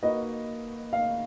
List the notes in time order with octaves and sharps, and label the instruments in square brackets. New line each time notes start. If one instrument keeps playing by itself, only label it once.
[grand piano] A#3 D#4 F#4 B4 [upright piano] D#5
[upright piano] F5